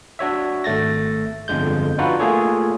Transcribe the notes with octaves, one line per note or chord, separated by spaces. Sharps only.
D4 F#4 C#5 E5
G#1 A3 A6 A#6
G1 F2 D3 G#3 G6
D4 D#4 F4 F#4 B4 F#5
A3 A#3 F4 G#4 A4 C#5